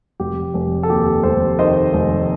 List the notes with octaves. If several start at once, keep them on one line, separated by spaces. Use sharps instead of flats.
F1 G4
F1
A4
D#2 G4
F1 A4 C5
D#3 C5 D#5
F1